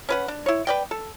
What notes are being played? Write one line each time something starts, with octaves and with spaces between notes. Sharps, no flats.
C#4 B4 F#5
D4
E4 C#5
B4 D5 G5
A4